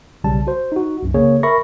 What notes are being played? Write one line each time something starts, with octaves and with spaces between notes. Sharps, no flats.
B1 C#3 F#3 G3 A5
F#4 C5
D#4 F#4
C2 F#2
C#3 A#3 G#4 C#5
A#4 E5 B5 C#6 A#6